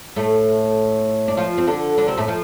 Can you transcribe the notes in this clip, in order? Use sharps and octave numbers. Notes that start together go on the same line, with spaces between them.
A2 A3
D4
F3 F4
C4
D3 D4
D3 D4
C3 C4
A2 A3
F3